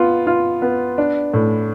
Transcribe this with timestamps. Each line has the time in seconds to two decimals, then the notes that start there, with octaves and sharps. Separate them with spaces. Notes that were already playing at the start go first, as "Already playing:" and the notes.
Already playing: B3 F4
0.27 F4
0.62 B3
0.98 D4
1.34 A2